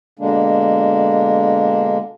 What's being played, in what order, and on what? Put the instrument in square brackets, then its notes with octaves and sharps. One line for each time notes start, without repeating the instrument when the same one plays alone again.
[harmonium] B2 D3 G#3 A#3 D4